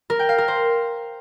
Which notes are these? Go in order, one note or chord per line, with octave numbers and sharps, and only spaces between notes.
A#4
G5
F5
A#4
C5